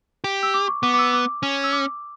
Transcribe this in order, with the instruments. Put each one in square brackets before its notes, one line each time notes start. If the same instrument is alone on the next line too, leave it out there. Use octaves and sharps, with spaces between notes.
[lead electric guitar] G4
[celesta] E6
D6
C#6
[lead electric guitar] B3 [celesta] D6
[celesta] D6
E6
D6
[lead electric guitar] C#4
[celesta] E6
D6